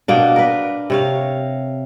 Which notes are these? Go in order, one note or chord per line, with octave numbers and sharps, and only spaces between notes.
B2 A#3 D4
A#4 B4
C3 C#5 F5